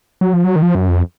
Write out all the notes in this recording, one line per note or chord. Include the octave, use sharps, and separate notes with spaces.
F#3
F3
F#3
D#3
F3
F#2
F2